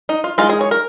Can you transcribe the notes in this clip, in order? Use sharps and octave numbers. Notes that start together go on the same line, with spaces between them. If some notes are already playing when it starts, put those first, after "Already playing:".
D#4
F4
G#3 D#4 F4
G#4
C#5
A#4